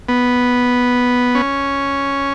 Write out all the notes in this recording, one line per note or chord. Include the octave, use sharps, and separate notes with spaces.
B3
C#4